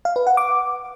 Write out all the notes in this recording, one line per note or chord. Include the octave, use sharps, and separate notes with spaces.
F5
B4
F#5
D6